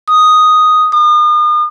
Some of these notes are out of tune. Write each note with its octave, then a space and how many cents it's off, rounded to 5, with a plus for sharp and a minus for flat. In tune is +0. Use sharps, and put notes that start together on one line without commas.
D#6 +0
D#6 -40